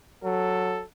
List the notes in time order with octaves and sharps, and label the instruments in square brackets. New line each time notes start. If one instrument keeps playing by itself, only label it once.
[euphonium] F#3 [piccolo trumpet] A4